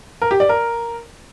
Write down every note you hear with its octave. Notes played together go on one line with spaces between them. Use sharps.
A#4
G4
D5
A#4